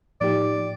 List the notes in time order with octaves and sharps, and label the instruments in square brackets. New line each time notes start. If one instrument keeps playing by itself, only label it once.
[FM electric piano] A2 F3 A#3 D#4 G4 [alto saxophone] D5